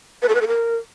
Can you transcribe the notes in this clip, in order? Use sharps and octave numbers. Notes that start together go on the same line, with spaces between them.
B4
A4
B4
A4
A#4